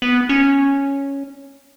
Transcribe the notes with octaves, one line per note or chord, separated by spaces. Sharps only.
B3
C#4